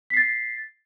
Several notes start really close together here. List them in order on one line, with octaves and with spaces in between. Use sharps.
B6 C7 A6